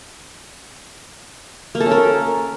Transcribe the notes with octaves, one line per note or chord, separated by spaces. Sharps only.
A#3
A4
C#4
A#4